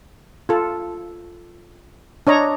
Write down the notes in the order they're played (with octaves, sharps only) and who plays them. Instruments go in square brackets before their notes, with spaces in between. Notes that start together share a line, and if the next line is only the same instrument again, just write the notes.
[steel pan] F4 A4
D4 C#5 D#5 A#5